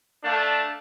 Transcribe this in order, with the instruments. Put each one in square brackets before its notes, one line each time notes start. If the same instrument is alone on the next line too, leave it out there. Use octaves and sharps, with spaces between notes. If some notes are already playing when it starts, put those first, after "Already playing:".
[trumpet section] A3 D4 F5 A5